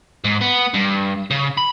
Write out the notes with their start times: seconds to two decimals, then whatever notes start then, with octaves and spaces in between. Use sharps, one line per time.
0.25 G#2
0.41 B3
0.74 G2
1.31 C#3
1.58 B5